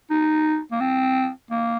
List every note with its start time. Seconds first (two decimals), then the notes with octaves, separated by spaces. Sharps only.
0.10 D#4
0.72 A#3
0.81 C4
1.51 A#3